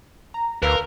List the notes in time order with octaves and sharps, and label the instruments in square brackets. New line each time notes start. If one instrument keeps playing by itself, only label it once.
[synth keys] A#5
[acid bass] D2 [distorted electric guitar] A#4 [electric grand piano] B4 F5 E6